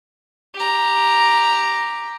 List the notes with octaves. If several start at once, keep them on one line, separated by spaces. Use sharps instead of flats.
G4 A#5